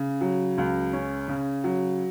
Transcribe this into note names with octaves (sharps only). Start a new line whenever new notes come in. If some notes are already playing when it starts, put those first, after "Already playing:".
Already playing: C#3
F#3
C#2
C#4
C#3
F#3